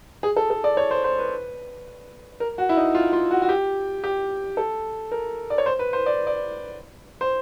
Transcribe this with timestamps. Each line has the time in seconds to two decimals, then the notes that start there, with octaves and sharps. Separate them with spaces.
0.23 G#4
0.36 A4
0.50 A4
0.64 D5
0.77 C#5
0.91 C5
1.04 C5
1.18 B4
2.40 A#4
2.58 F#4
2.69 E4
2.77 D#4
2.95 F4
3.13 F4
3.31 F#4
3.42 F#4
3.49 G4
4.04 G4
4.57 A4
5.11 A#4
5.50 D5
5.58 C#5
5.66 C5
5.79 B4
5.93 C5
6.06 D5
6.27 D5
7.21 C5